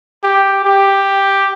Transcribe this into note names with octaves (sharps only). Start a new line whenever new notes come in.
G4
G4